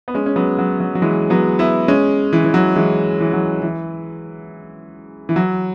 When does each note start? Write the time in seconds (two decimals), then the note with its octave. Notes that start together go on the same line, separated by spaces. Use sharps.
0.08 B3
0.14 G#3 C#4
0.26 C#4
0.36 F#3 B3
0.58 F#3
0.80 F#3
0.95 F#3
1.02 E3 G#3
1.30 F#3 B3
1.59 B3 E4
1.88 G#3 C#4
2.33 E3
2.44 E3
2.54 F#3
2.76 E3 G#3
3.21 E3
3.33 F#3
3.62 E3
5.29 E3
5.36 F#3